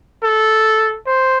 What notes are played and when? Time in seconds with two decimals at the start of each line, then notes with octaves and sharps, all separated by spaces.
0.23 A4
1.07 C5